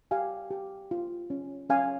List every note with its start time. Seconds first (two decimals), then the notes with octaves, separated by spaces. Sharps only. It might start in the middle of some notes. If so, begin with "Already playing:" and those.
0.11 G4 F5 G#5
0.51 G4
0.91 F4
1.30 C#4
1.70 C#4 F5 G#5